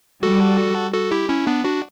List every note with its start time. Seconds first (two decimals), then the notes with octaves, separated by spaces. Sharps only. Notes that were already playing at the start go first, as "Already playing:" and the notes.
0.22 G3 F#4 A4
0.94 F#4 A4
1.11 E4 G4
1.29 C#4 E4
1.47 B3 D4
1.65 D4 F#4